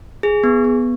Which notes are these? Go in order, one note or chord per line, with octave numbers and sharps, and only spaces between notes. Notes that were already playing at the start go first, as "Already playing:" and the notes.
G#4
B3
B3